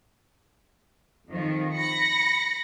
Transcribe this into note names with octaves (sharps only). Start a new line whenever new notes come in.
F2 D#3 F3
B5 A#6 C#7